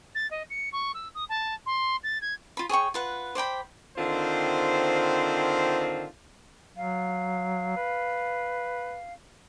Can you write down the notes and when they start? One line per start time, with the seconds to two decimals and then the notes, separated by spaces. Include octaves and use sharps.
0.15 A6
0.31 D#5
0.50 C#7
0.73 C#6
0.94 E6
1.15 D#6
1.29 A5
1.66 C6
2.04 A6
2.21 G#6
2.57 F4 B5
2.69 G#4 C#5 G5 C#6
2.94 F4 B4 F#5
3.35 C5 D5 G5 B5
3.97 D3 D#3 C4 F4 C5
6.77 F#3 F5
7.77 B4